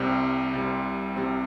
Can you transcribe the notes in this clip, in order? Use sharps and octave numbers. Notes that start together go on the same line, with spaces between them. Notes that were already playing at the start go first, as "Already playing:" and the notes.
Already playing: C2 C3 G3 C4
C2 C3 G3 C4
C2 C3 G3 C4